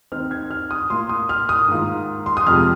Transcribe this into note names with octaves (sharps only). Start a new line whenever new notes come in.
D#2 D#3 C4 D#4 F6
G#6
F6
D#6
A#2 A#3 F4 C6
D#6
F6
D#6
G#2 D#3 A#3 F4
C6
D#6
F2 C3 F3 G#3 F6